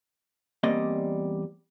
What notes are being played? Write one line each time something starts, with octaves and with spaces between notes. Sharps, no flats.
E2 G3 A#3 C4 D5 D#5